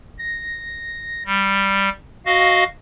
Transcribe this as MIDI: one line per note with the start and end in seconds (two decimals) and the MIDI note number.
0.18 1.23 94
1.26 1.89 55
2.26 2.64 66
2.26 2.64 75
2.26 2.64 77